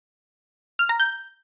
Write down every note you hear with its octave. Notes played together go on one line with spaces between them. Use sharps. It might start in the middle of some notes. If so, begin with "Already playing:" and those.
F6
A#5
G6